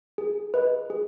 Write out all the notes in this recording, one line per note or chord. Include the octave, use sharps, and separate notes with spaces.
G#4
B4 D#5
G#4